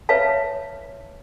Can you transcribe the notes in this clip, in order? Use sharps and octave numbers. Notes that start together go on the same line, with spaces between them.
B4 C#5 E5 F5 A5